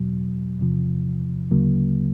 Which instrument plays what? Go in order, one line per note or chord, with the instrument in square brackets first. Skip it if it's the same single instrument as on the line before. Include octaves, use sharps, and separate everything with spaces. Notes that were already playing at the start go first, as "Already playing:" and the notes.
Already playing: [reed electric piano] E2 B2 F#3
E2 C3 F3
D2 C#3 F#3 A#3